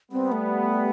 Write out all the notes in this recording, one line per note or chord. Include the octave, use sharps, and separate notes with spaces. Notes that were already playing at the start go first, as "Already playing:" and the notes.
G3 B3 C4
A3